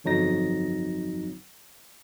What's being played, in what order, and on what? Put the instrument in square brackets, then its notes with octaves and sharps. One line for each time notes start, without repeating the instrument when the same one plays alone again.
[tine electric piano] G1 F2 F#3 D#4 A#6